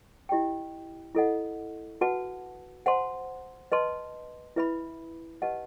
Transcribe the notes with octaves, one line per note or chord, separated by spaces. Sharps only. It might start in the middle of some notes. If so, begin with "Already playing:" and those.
E4 G4 D#5 G5
E4 A4 D#5 F#5
F#4 B4 F#5 A5
C5 F#5 A5 C6
B4 D#5 A5 C6
E4 B4 E5 B5
G4 B4 D#5 F#5 A5